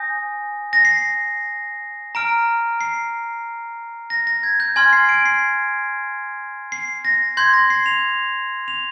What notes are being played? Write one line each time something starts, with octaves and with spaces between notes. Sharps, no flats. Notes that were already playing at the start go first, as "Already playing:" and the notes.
Already playing: G#5 D#6 G6 A#6
A#6
C7
A#5 F6 D7
C7
A#6
A#6
G#6
G6
G#5 C6 F6 G#6
C7
D7
C7
C7
A#6
C6 G6 G#6
A#6
C7
F7
F7